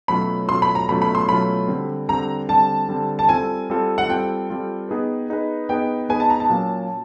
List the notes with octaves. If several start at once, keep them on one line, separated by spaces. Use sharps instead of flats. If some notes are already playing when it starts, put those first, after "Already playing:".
B2 F#3 A3 C#4 F4 B5
B2 F#3 A3 C#4 F4 C6
B5
A#5
B2 F#3 A3 C#4 F4 B5
B5
C6
B2 F#3 A3 C#4 F4 B5
D3 G3 C4
D3 G3 C4 A#5
D3 G3 C4 A5
D3 G3 C4
A5
G3 C4 F4 A4 G#5
G3 C4 F4 A4
F#5
G3 C4 F4 A4 G5
G3 C4 F4 A4
B3 D#4 G#4 B4
B3 D#4 G#4 B4
B3 D#4 G#4 B4 G5
B3 D#4 G#4 B4 G#5
A5
A#5
A5
A#2 F#3 A#3 C#4